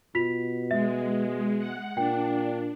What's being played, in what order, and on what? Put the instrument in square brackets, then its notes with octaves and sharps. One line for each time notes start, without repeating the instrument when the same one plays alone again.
[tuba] B2 [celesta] F4 B6 F7
[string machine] G#3 [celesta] E5
[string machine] F#5
[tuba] A#2 [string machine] D4 [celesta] G5